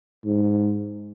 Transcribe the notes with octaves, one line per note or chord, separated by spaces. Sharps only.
G#2